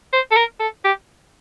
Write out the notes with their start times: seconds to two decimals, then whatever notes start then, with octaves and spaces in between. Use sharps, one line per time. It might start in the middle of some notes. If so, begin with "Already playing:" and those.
0.13 C5
0.31 A4
0.37 A#4
0.60 A4
0.85 G4